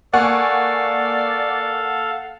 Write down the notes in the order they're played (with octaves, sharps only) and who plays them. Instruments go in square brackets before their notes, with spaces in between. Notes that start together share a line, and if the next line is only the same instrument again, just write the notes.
[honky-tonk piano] A#3 G#5 C#6 [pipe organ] A4 F5 [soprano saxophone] D5 [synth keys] F#5